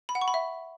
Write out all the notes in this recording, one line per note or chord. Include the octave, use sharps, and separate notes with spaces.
B5
F#5
C#6
B5
E5